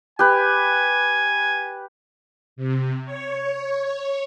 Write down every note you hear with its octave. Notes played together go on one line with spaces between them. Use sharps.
G4 B4 G#5
C3
C#5